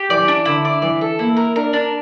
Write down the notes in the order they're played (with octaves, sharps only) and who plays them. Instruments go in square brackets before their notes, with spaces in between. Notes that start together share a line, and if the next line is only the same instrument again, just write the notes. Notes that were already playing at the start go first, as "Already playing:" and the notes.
Already playing: [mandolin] G4
[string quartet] E3 [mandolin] D5
[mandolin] D4
[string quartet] D3 [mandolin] E4
[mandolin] D5
[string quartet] E3 [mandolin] D5
[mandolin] A4
[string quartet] A#3 [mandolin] E4
[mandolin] A#4
[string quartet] D4 [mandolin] A#4
[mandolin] D4